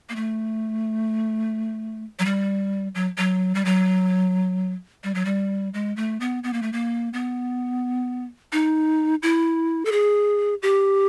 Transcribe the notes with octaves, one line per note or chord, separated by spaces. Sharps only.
A#3
A3
F#3
G3
F#3
F#3
G3
F#3
G3
F#3
G3
G#3
A3
B3
B3
A#3
A3
A#3
B3
D#4
E4
A4
G#4
G4